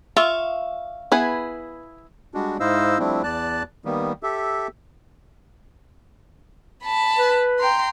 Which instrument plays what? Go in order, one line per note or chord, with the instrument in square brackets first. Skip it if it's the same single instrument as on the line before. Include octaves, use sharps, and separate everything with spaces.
[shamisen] F4 [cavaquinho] E5 F5 C#6
[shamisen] B3 [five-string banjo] E4 G#4 B4
[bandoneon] G3 G#3 D4 F#4
G#2 E4 C5 D#5 F5 E6
F3 G3 A3 C4 D4 E4
E2 D5 A5 F#6
D#3 G3 A#3 B3
G4 A4 E5
[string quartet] A5 B5
[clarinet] B4
[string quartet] G5 A#5 C6